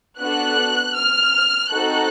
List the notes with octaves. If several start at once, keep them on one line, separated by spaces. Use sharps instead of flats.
B3 D4 F#4 A4 F#6
F6
C4 D#4 F#4 A4 F#6